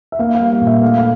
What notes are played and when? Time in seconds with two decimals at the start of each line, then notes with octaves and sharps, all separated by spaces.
0.12 E5
0.19 A#3 F5
0.35 F5
0.40 G3
0.51 F5
0.61 A#2
0.67 E5
0.82 A3 F5
0.98 F5